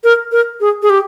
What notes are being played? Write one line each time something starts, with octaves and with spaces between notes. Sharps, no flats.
A#4
A#4
G#4
G#4
G4